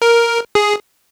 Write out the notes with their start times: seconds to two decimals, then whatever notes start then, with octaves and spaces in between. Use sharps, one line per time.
0.02 A#4
0.55 G#4